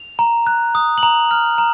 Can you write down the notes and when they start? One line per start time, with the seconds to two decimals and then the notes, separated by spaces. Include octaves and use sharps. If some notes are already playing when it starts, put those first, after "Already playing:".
Already playing: F7
0.19 A#5
0.47 F#6
0.75 D#6
0.98 F#7
1.03 A#5 F7
1.31 F6
1.58 A#5